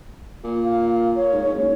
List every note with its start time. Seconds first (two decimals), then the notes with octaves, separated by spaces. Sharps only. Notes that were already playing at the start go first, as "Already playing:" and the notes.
0.44 A#2
0.64 F5
1.16 C#5
1.32 G#2
1.53 F#1